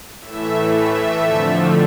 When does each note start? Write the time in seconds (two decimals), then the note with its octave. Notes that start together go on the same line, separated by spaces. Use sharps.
0.21 A2 E3 A3 E5
0.71 E5
1.21 F2 D3 F3 A3